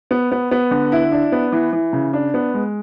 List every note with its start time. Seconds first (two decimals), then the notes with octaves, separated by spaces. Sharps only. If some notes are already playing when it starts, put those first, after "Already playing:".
0.11 B3
0.32 B3
0.51 B3
0.71 D3
0.92 E4
1.12 D4
1.32 B3
1.52 E3
1.73 E3
1.93 C#3
2.13 D4
2.34 B3
2.54 G#3